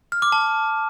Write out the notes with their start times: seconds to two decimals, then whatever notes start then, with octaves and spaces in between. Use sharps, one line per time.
0.12 F6
0.22 D6
0.32 A5